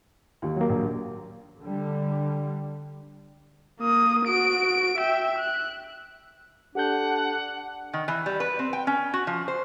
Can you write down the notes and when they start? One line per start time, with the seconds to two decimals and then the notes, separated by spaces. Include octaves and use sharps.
0.42 D#2 D#3
0.57 F#3 A#3
0.69 A#1
1.61 D3 G3
3.80 A#3 D#6
4.27 F#4 D7
4.98 E5 G5
5.39 F#6
6.75 D4 G4 A4 F#5 G6
7.93 D#3
8.08 E3
8.26 G3
8.40 B4
8.59 C4
8.73 G5
8.87 C#4
9.14 F#4
9.27 F3
9.48 C5